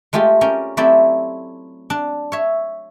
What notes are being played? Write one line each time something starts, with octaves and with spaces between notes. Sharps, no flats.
G#3 A3 F4 G4
C#4 A#4 D5 G5
F#3 A3 C4 E4 G4 D5
D4
C#5 E5